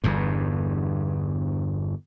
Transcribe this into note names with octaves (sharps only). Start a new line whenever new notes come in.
G1 E2 G2